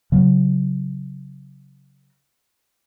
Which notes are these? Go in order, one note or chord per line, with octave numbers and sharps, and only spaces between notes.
C#3 F#3